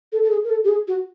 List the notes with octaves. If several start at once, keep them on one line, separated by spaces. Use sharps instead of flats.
A4
A4
G#4
A#4
A4
G4
G#4
F#4